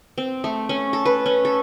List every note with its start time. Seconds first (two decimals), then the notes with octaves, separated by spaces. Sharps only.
0.18 C4
0.44 A3
0.69 C#4
0.93 A4
1.05 B4
1.26 C#4
1.45 A4